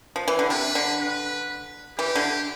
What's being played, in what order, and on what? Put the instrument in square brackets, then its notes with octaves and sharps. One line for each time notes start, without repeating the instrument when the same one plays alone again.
[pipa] F3
E3
D3
[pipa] C3 [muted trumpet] B4
[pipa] D3
[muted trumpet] B4
[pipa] E3 [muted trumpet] G4
[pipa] D3